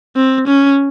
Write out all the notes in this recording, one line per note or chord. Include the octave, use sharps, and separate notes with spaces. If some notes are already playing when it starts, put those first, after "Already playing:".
C4
C#4